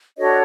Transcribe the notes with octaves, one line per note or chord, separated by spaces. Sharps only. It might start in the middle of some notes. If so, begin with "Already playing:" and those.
D4 F#4 A4 C#5 D#5